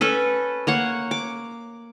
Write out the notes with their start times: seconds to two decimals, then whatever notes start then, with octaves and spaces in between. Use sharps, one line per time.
0.01 C#4 A4 B4
0.67 A#3 C#5 F#5
1.11 D6